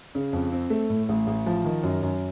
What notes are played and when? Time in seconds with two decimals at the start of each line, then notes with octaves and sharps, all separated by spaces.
0.15 C#3
0.33 F2
0.52 C4
0.70 A3
0.90 A2
1.09 A1
1.27 A1
1.46 F3
1.65 D#3
1.83 F#2
2.02 F#2